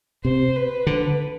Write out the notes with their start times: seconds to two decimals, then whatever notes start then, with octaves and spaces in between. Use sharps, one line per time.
0.25 C3 C5
0.56 B4
0.87 D3